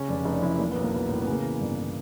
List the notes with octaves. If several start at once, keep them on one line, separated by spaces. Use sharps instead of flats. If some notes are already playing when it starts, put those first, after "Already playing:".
Already playing: C#3 C#4
F1 D4
F1 D#4
F2 E4
E3 A#3
B1 B3
A#3
B1 B3
A2 A#3
C#3 B3
A#3
E3
G1